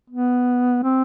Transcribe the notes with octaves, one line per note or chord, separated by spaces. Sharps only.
B3
C4